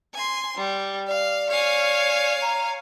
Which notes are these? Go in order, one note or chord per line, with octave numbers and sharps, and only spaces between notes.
G#5 C6
G3
D5 F5
C#5 F5 G#5
A#5